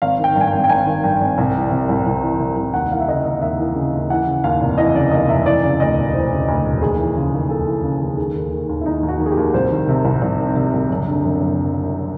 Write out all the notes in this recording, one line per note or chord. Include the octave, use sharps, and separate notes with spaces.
G#1 F5
D#3 G5
G2 G#5
G5
G#1
G5
G#1 G#5
D#3
G2 G5
G#1
C2
E3
C3
C2
C2
E3
C3
C2
D#2 F#5
E3 F5
E5
C#3 D#5
D#2 D#5
D#2 E5
E3
C#3
D#2
E3 F#5
C#3
D#2 F5
F1
E3 D#5
C#3 D5
D#2 D#5
F1 E5
E3 D5
C#3
D2 D#5
E1
E3 C5
C#3
D2
E1
D#2 G#4
E3
C#3
D#2
D#2 A4
E3
C#3
D#2
D#3 G#4
D#2
D#3
D#2
E4
D#3 D#4
D#2
F#4
D#3
G#4
G4
D#2
C2 C5
D#3
C3
C2
C2
D#3
C3
C2
F#1
D3
F#2
F#1